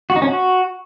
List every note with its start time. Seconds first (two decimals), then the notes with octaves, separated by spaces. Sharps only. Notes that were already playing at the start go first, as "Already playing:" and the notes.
0.10 F#4
0.16 D#4
0.22 C#4
0.28 F#4